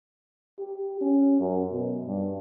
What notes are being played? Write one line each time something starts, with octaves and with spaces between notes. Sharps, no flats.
G4
C#4
F#2
B2
G2